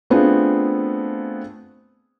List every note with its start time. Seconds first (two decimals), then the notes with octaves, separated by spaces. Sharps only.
0.10 A3 B3 C4 D4 F4 G#4